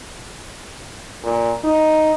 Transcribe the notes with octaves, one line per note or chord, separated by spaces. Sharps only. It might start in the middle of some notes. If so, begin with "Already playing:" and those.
A#2
D#4